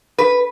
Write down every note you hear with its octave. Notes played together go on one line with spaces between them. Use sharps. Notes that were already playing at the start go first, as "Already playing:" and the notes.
B4